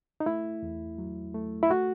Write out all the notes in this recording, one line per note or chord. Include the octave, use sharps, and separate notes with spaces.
D#4
A3 E4
E2
F#3
A3
E4
A3 F#4